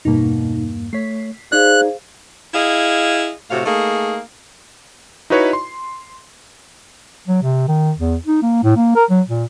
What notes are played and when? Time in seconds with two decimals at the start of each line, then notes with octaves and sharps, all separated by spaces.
0.05 E2 G2 B2 A#3 D#4
0.93 A3 C#5 B6 C7
1.52 D#4 G#4 C5 D5 F5 F#6
2.54 E4 G#4 D#5 F5
3.51 A2 C3 F#4 F5
3.66 A3 A#3 D#4 G#4
5.30 D#4 E4 F#4 B4 C#5 D#5
5.53 C6
7.27 F#3
7.43 C3
7.68 D#3
7.98 E2
8.26 D#4
8.43 A#3
8.64 A2
8.77 A#3
8.96 A#4
9.10 F#3
9.29 A#2